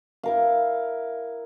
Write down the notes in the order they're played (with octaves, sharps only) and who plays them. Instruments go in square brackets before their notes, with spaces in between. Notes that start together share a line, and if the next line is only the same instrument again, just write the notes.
[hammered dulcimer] E4 A#4 F5